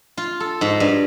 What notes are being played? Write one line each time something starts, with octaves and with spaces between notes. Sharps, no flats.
F4
A4
G#2
G2